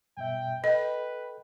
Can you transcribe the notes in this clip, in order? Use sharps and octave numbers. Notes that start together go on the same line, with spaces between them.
G2 B2 E5 G5
A4 B4 D#5 G5